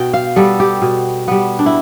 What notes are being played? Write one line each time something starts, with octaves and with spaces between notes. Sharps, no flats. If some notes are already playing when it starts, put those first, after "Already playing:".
Already playing: B2 G5
F5
G3 B3 A4
G4
B2
G3 B3
D4
E4